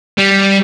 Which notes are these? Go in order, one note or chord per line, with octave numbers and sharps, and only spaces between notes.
G3